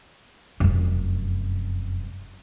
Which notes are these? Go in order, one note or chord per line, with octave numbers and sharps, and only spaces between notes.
F1 F#2